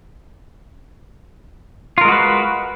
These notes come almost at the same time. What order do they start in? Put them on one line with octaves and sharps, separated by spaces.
F4 A#4 G#3 F#4 B4